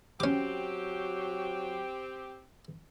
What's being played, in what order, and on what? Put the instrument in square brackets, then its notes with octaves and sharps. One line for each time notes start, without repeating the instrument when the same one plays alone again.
[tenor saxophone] F#3 [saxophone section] C4 G4 [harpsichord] C#4 D6